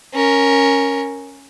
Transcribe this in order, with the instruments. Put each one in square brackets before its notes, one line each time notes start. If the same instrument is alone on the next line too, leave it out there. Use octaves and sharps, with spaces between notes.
[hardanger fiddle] C#4 A#4